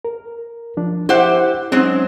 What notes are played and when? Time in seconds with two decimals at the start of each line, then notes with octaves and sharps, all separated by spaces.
0.05 A#4
0.77 F3 D4
1.09 E4 G4 C5 E5 F#5
1.72 F#3 G#3 C4 C#4 D#4